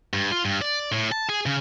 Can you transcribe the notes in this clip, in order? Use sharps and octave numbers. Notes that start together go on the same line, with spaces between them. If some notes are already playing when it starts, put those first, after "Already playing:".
G2
F4
G2
D5
A2
A5
G#4
C#3